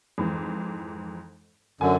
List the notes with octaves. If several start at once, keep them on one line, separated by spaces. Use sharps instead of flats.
F2 G#2 E3
F#2 D3 G#5